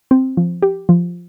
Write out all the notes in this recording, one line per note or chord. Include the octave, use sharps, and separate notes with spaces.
C4
F3
G4
F3